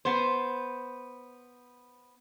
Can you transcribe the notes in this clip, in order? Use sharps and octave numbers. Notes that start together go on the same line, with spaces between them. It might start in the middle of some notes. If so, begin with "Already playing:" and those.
B3 C5